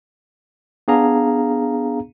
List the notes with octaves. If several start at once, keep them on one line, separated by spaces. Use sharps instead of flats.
B3 D4 G#4 F5 A#5